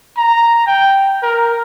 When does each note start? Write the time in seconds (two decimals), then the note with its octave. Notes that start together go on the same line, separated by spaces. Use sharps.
0.18 A#5
0.67 G5
1.23 A#4